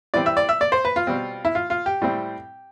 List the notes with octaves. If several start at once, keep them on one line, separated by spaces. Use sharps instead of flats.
E3 G3 C4 D5
E5
D5
E5
D5
C5
B4
F4
B2 G3 C4
E4
F4
F4
G4
A2 G3 C4